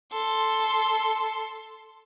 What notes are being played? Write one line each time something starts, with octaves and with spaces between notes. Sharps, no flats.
A4 C6